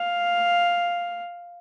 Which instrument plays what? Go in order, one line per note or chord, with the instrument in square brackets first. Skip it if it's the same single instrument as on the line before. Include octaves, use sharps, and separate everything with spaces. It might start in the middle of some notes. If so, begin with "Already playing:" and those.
Already playing: [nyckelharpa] F5